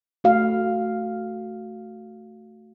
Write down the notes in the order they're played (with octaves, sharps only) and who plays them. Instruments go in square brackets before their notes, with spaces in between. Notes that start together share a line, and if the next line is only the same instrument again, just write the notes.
[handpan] A3 F#4 F5